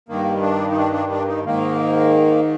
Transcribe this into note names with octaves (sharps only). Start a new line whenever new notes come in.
G2 D#3 A#3
D4
D#4
D4
D4
D4
D#4
G#2 D#3 A#3